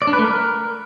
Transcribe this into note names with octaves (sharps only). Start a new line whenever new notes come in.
D5
D4
B4
A3
A#4